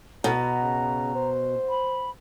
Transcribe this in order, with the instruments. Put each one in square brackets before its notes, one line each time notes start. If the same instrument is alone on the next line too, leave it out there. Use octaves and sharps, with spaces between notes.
[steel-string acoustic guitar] B2 [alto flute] A#5
[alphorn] C#3
C5
[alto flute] B5